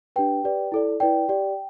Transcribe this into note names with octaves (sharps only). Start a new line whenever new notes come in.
D4 G4 B4 G5
G4 B4 D5
E4 A4 D5
E4 B4 D5 G5
G4 D5